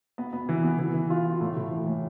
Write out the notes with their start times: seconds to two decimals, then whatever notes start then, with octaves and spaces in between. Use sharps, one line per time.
0.18 B3
0.33 B3
0.49 E3
0.63 B3
0.79 E3
0.94 E3
1.10 F4
1.26 F4
1.41 A2
1.56 A2
1.72 E3
1.87 A2